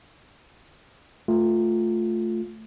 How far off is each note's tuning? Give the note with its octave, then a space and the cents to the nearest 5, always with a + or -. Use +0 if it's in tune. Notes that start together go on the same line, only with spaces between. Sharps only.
A3 +0 F4 +5